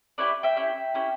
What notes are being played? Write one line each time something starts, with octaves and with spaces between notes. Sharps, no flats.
C#4 E4 G4 B4 D5
E5 G5
C#4 E4 G4
C#4 E4 G4